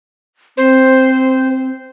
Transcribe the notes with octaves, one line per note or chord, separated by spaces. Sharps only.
C4 C5